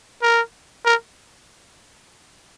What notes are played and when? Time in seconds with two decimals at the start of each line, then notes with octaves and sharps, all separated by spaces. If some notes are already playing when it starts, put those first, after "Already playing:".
0.22 A#4
0.85 A#4